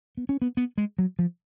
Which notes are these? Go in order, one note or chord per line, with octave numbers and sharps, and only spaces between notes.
B3
C#4
B3
B3
G#3
F#3
F3